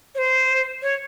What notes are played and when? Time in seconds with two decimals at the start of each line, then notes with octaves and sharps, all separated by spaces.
0.15 C#5
0.18 C5
0.82 C#5